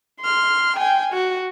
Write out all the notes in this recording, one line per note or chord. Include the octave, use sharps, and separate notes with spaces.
C6 F6
G5 G#5
F#4